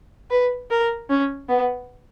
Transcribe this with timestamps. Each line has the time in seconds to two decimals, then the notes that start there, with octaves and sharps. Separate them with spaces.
0.30 B4
0.71 A#4
1.09 C#4
1.48 B3